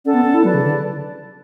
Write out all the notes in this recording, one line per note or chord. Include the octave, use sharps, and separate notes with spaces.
C#4 A4 D5 F#5
B3
C#4
E4
F#3 B4 D5 A5
C#3
D3